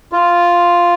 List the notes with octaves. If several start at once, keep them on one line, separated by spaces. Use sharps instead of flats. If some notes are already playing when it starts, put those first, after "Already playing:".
F4